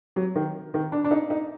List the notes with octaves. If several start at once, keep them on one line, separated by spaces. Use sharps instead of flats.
F#3
D#3
D#3
D4
D4
D#4
D#4